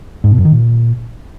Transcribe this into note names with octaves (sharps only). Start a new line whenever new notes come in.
G#2
B2
F#2
D#3
A#2